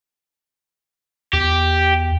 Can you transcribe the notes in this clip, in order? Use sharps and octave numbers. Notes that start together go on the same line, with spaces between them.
E2 G4